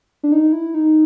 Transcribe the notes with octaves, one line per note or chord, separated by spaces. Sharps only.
D4
D#4
E4
D#4